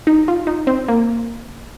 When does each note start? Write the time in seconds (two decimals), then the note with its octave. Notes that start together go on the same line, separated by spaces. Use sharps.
0.07 D#4
0.28 F4
0.47 D#4
0.67 C4
0.88 A#3